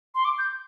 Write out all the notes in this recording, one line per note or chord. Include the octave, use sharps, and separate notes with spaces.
C6
D6
G6